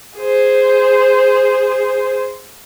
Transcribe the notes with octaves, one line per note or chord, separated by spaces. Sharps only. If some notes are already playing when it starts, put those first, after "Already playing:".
G#4 C5